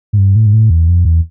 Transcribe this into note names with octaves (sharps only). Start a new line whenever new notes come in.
G#2
G2
A2
G#2
A2
E2
F2
E2